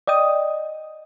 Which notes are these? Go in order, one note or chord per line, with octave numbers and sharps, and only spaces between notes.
D5 D#5 G5 D#6